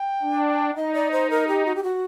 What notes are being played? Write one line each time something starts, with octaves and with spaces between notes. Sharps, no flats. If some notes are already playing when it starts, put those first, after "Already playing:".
Already playing: G5
D4
D#4 D#5
D5
C5
A#4
G4
F#4
G4
F#4